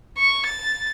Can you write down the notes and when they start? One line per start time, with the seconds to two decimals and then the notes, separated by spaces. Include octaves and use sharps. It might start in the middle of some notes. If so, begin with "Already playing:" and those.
0.17 C#6
0.46 A6